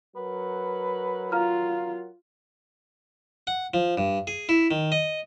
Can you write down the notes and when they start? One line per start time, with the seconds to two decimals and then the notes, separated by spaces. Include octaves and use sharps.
0.16 F#3 A#4 B4 F#5
1.32 F4 F5 A#5 F6
3.47 F#5
3.74 F3
3.97 G2
4.27 G#4
4.49 E4
4.71 D#3
4.92 D#5